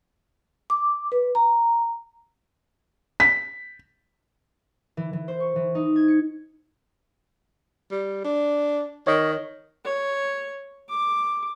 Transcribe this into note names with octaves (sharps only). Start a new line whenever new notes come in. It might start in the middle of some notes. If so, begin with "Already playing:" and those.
D6
B4
A#5
B6
E3
E3
C5
C#6
E3
D#4
G#6
C#7
G3
D4
D#3 C#5 D#5
C#5
D6